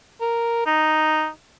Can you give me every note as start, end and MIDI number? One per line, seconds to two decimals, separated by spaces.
0.21 0.65 70
0.66 1.28 63